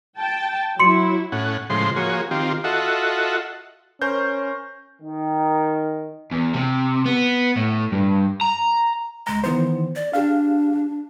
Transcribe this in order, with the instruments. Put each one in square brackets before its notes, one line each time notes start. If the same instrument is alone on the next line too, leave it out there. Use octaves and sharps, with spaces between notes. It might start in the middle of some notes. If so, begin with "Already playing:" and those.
[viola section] G5 A5
[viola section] F#3 E4 [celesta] C6 C#7
[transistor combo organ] A2 C#4 F#5
A2 C#3 F3 G#3 C5 C6
F3 A#3 F#4 G#4 C#5
D#3 C4 F4 G4
F4 F#4 A4 D#5 E5 F#5
[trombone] C#4 [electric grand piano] A#4 C5 G6
[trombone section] D#3
[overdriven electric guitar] E2
C3
B3
A2
G2
A#5
[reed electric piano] C#2 A#5 [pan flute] G#3
[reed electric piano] D#3 E3 C5 [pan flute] B3
[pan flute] D5
[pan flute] D4 [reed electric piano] G4 G#4 F5